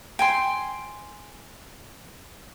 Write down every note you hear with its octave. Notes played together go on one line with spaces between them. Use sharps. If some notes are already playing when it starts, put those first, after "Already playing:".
G5 G#5 C6